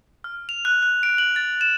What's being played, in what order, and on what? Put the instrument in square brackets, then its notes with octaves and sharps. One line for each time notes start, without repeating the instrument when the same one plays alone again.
[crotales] F6
F7
F#6
F#6
D7
F#7
A6
E7